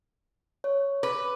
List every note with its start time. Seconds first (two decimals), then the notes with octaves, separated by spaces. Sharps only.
0.64 C#5
1.03 B4 D6